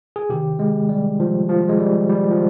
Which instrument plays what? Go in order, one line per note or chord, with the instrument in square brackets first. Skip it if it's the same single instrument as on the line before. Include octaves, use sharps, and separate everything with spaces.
[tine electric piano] G#4
C3 D#3 G4
G#3
G3
F3
F3
G#3
G3
G3
F3